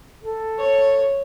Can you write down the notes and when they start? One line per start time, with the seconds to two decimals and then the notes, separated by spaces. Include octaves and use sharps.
0.24 A4
0.59 C#5